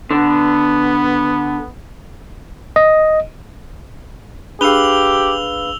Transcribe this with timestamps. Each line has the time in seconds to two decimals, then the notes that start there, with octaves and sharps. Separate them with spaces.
0.11 D3 B3
2.76 D#5
4.61 D4 G4 G#4 B4 F5 E6 F7 G7